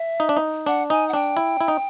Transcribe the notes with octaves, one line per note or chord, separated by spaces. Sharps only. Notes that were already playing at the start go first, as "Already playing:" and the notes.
Already playing: E5
D#4
D4
D#4
D4 F#5
D#4 G#5
F#5
D4 G5
E4
E4
D#4